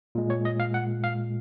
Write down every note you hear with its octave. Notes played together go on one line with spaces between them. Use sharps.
A#2 G#3
C#5
D#5
F5
F#5
F5